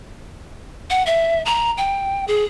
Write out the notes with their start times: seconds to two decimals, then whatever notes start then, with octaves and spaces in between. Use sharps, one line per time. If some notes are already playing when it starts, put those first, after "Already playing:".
0.90 F#5
1.06 E5
1.46 A#5
1.78 G5
2.28 G#4